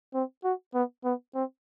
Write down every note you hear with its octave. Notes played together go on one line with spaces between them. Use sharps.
C4
F#4
B3
B3
C4